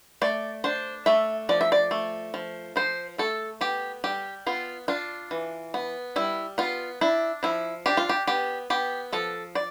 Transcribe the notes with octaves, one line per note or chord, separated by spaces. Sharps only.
A3 D5
D4 C5
A3 E5
F3 D5
E5
D5
A3
F3
F3 C5
A3 A4
B3 G4
G3 G4
B3 F4
D4 F4
E3
B3
G3 E4
B3 F4
D4 E4
F3 E4
D4 G4
F4
G4
B3 G4
B3 G4
F3 A4
D5